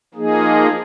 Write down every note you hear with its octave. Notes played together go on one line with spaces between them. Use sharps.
F3 A#3 D#4 G#4